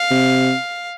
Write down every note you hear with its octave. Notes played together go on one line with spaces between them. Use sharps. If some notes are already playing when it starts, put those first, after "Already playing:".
Already playing: F5
C3